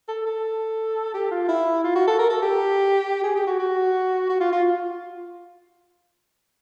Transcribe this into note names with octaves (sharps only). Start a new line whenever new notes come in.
A4
A4
G4
F4
E4
F4
F#4
A4
A#4
A4
G4
G#4
G4
F#4
F#4
F#4
F4
F4